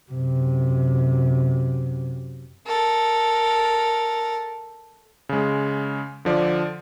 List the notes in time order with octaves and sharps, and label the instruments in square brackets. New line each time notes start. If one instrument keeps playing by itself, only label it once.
[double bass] F#2 C3
[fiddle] A4 A#4
[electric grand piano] C#3 G#3
D3 F3 D5